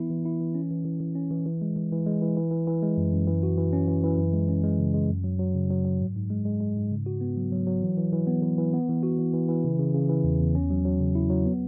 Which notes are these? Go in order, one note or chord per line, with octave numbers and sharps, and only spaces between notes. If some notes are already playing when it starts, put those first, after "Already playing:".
Already playing: E3 B3 E4
E3
E4
E3
C#4
E3
E3
E3
C#4
E3
E3
G#3
E3
E3
G#3
E3
E3
E3
E3
G#3
F#2
F#2
E3
F#4
E3
C#4
E3
E3
F#2
G#3
C#4
G#3
C#3
G#3
F#2
F#3
F#3
C#3
F#3
F#3
G#2
G#2
G#3
G#3
G#3
G#2
C#3
F#4
B3
F#3
F#3
F#3
E3
E3
E3
B3
E3
E3
B3
E3
F#4
E3
E3
E3
C#3
C#3
C#3
E3
E2
E2
C#4
F#3
F#3
C#3
E4
F#3
B3